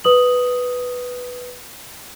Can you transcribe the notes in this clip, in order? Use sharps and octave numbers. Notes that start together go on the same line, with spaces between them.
B4 D#6 F#7